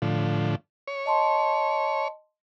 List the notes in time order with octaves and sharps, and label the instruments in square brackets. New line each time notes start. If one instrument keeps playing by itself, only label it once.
[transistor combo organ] A2 D3 F3
C#5
[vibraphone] D#5 A5 C6